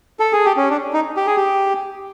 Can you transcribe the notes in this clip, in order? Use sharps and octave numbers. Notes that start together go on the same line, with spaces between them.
A4
G#4
G4
C#4
D4
D#4
G4
G#4
G4